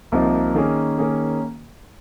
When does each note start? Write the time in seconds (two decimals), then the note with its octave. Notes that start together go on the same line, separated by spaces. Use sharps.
0.12 C2 C3 F3 A#3 D#4
0.55 D#3 A#3 C#4 G#4
0.98 D#3 A#3 C#4 G#4